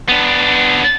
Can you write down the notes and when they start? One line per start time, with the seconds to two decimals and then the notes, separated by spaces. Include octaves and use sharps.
0.09 B3 D4